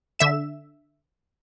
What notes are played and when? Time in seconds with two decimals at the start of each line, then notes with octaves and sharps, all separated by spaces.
0.19 D3 E5 E7